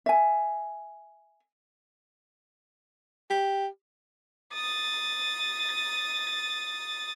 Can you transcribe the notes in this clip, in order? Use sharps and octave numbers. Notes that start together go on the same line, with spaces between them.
E5 G#5
G4
D#6 A6